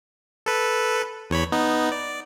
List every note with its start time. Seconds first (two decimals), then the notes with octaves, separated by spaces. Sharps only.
0.46 A4 B4
1.30 E2 C#5 B5
1.52 B3 D#4
1.92 D5